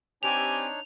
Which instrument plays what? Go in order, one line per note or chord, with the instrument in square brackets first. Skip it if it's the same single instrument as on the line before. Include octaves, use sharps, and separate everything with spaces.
[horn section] C4 G4 [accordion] D4 D#4 C#5 [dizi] G#5 [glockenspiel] F7